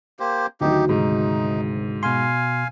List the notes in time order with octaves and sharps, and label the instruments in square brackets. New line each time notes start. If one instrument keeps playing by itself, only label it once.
[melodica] A#3 G4 C5
[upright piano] D2 D#3 F#3 [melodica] D#4 G4
[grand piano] G#2 [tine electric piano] C3 [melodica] D#4
[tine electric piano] B2 C6 [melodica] F5 G#5